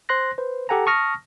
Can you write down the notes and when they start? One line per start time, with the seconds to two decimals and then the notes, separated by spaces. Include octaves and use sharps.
0.09 C5 C6 F#6 A#6
0.38 B4 C5
0.69 G4 A4 F#5 G#5 A#5
0.86 A5 C#6 D#6 F6 A#6